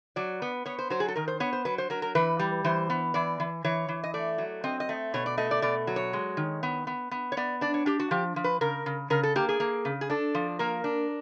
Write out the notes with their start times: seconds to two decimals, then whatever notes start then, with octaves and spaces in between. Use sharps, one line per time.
0.16 F#3 D5
0.42 B3
0.66 B3 C#5
0.79 C5
0.90 F#3 C5
1.00 G#4
1.08 A4
1.16 D#3 A#4
1.28 C5
1.40 B3 C#5
1.53 C5
1.65 F#3 B4
1.78 C5
1.90 F#3 A#4
2.02 A#4
2.15 E3 B4
2.39 G3
2.64 E3 C5
2.90 B3
3.14 E3 D5
3.40 E3
3.64 E3 C#5
3.89 E3
4.04 D#5
4.14 A3 D5
4.38 F#3
4.64 C4 D#5
4.80 D#5
4.89 A3
5.14 B2 C#5
5.26 D5
5.37 A3 D#5
5.51 D5
5.62 B2 D5
5.87 F#3
5.96 C#5
6.13 G#3
6.37 D#3
6.63 B3
6.87 B3
7.11 B3
7.32 C#5
7.37 B3 D5
7.61 D4 D5
7.74 C#5
7.86 D4 G4
8.00 F#4
8.11 F3 G4
8.36 F3
8.44 B4
8.61 C#3 A#4
8.86 C#3
9.10 C#3 A#4
9.23 A4
9.36 A#3 G4
9.49 G#4
9.60 A#3
9.85 C#3
10.01 G#4
10.10 D4 A4
10.35 F3
10.59 A#3 A#4
10.84 D4